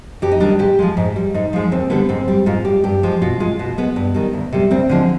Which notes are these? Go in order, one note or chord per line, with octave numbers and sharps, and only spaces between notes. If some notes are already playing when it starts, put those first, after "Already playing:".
F2 G4
D#4
D#3 G3 D4
G#2 G4
F3 G#3
G#2
G3
G#2 D#4
F3 G#3
D#2 C4
D3 G3 B3
G#2 C4
G3
G#2 F4
G3 G4
G2 G4
F3 G#3
B2 F4
G#3 F4
B2
G#3 B3
G2
D#3 G3
D2
C3 G3
D2 C4
D3 F3 G#3